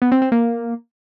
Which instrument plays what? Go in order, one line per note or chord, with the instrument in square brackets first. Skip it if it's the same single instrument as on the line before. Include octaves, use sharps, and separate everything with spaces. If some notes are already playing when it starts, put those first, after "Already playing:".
[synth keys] B3
C4
C4
A#3